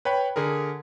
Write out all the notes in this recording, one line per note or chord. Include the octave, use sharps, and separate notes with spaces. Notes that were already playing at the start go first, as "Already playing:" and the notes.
B4 C#5 G5 B5
D3 G#4 A#4